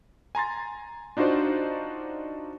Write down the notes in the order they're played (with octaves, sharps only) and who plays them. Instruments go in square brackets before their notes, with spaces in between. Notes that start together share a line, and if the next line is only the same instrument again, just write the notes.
[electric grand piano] G#5 A#5 C6 A6
D4 D#4 F4 F#4 C5 D5